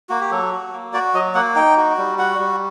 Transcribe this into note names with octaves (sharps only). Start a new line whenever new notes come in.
A#3 F#4
G4
F#3 A4
F#4
A#3
F#4 D5
F#3 D#5
A#3 F#5
D#4 G5
F#4
G3
F#4 F#5
G3